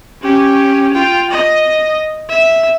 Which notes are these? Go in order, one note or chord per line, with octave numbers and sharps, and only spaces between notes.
C#4 G4
F4 G5
D#5
E5